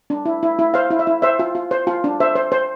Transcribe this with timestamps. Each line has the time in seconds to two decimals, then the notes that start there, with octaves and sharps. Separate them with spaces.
0.10 D4
0.26 E4
0.43 E4
0.59 E4
0.74 C5 F5
0.91 E4
0.99 E5
1.07 E4
1.22 C5 E5
1.39 F4
1.55 F4
1.71 C5
1.87 F4
2.04 D4
2.20 C5 E5
2.35 C5
2.52 C5